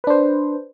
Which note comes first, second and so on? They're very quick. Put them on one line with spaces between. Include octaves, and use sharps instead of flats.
B4 D4 C5